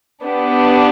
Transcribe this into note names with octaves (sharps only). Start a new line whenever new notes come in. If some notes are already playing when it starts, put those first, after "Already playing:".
B3 D4 G4